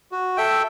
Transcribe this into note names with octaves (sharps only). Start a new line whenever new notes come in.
F#4
A4 E5 G5